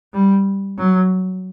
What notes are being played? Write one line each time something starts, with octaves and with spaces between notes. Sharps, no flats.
G3
F#3